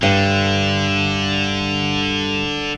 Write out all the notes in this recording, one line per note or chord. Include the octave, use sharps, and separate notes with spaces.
G2 D3